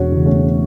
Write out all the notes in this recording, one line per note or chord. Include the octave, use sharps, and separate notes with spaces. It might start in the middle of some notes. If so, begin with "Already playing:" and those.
Already playing: E1 C#4 F#4
E2 C#3
A3 C#4